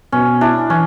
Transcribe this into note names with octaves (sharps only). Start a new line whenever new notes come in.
B2 C#4
D4 E4
E3 C#4